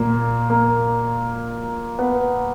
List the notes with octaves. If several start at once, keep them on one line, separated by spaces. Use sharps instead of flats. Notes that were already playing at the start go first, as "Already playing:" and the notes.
Already playing: A#2 A#3
A#3
B3